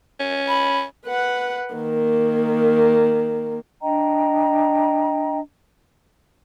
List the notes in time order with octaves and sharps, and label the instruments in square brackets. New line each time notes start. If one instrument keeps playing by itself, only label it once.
[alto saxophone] C#4
[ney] B5
[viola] B4 F#5
D#3 A#3
[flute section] D4 D#5 G5 A#5